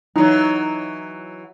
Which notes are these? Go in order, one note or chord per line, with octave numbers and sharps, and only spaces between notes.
E3 F#3 D#4